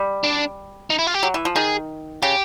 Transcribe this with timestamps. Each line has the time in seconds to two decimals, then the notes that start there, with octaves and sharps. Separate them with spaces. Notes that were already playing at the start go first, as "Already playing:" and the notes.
Already playing: G3
0.24 D4
0.90 D#4
0.99 E4
1.07 F4
1.14 G4
1.23 F#3
1.34 E3
1.45 F3
1.56 D#3 G#4
2.22 C#3 G4